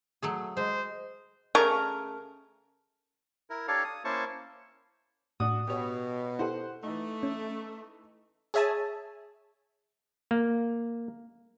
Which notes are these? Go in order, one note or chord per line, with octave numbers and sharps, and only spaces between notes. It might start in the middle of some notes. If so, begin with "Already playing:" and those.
F#3 A3 G#4
G#3 C5
C#3 A3 A#4 C#6
E4 A#4
D4 G4 A4 C#5 F5
D#6
A#3 C#4 E4 C5 A5 C#6
A2 D4 F#4 D#6
B2 G4 C#5
E4 G4 A4 C5 F#5
E3 A3 D#4
C#4
G#4 C#5 E5 G#5 A5
A#3